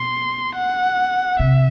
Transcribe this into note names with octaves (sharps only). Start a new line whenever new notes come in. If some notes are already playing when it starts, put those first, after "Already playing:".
Already playing: B2 C6
F#5
C3 E5